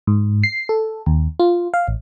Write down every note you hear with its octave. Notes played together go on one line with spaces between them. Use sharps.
G#2
C7
A4
D#2
F4
F5
A1